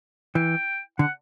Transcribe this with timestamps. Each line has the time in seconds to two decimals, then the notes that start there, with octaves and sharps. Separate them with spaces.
0.35 E3 G5
0.99 D3 F#5